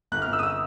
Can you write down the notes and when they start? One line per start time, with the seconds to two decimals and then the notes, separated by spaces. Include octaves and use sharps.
0.12 G1 F#6
0.22 F6
0.27 G1
0.33 E6
0.39 D#6
0.43 E6